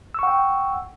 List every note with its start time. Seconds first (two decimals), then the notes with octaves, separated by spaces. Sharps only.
0.14 E6
0.19 C#6
0.23 F#5
0.27 G5